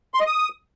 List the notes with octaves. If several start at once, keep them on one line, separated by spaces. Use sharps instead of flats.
C6
D#5
D#6